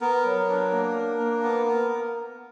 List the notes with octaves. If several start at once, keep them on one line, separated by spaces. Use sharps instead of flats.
B3 A#4
F#3
D4
A#3
D4
A#3
B3
B3